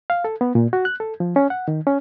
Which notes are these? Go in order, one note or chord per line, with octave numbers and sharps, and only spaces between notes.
F5
A4
B3
A#2
F#4
F#6
A4
F3
C#4
F#5
D#3
C#4